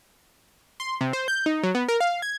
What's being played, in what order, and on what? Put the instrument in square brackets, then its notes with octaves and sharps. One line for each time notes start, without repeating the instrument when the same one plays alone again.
[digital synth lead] C6
C3
C5
G6
D#4
F#3
B3
A#4
F5
G#6